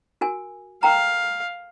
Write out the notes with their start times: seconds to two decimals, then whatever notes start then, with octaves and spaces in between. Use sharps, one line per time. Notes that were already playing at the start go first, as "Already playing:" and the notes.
0.21 F#4 A#4 G#5
0.83 A#4 F5 G5 A#5